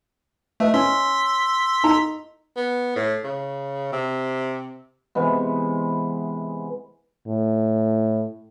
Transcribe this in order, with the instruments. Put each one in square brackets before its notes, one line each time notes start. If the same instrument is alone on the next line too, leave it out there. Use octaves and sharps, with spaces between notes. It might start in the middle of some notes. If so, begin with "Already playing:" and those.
[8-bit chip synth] A3 [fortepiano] B4 D#5 E5
[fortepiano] C#4 [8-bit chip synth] C6 E6 B6
[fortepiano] D#4 A#5
[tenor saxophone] B3
A2
C#3
C3
[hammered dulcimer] C3 E3 G#3 B3
[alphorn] A2